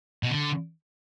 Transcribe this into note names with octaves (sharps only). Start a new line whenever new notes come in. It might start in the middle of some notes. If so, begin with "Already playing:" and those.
B2
D3